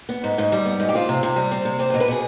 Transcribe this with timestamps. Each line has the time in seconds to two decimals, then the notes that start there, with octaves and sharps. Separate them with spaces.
0.09 B3
0.24 G#2
0.38 G#2
0.52 G3
0.65 B3
0.80 G#2
0.89 G4
0.95 C4 F4
1.09 C3
1.23 C3
1.36 G3
1.52 C4
1.65 C3
1.79 C4 G4
1.90 B4
1.94 B2
2.00 B4
2.08 B2 G#4